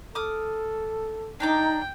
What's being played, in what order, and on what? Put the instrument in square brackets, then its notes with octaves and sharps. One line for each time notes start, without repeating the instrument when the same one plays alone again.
[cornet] A4 [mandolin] D6 D#6 F6
[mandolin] D4 A#5 D6 [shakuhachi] D#4 [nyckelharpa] G5